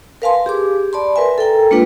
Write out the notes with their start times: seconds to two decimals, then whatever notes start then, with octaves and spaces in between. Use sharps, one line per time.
0.22 A#4 B4 F5 G#5 A5 C6
0.46 G4 G#4 D6
0.93 D5 A5 B5 C6
1.16 A#4 B4 E5 G#5
1.38 A4 A#4 G5 A#5
1.71 G#3 A#3 D4 F4 B4 G5